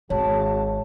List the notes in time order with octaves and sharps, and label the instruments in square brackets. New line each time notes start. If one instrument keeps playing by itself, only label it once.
[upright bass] G#1 [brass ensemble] F#4 G#4 A5 [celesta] C#5